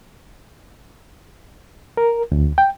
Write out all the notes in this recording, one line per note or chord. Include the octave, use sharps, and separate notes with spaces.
A#4
D2
G5